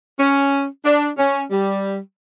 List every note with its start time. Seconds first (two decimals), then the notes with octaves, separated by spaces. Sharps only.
0.19 C#4
0.85 D4
1.18 C#4
1.51 G3